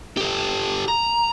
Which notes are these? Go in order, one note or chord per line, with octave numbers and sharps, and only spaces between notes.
G4 A4
A#5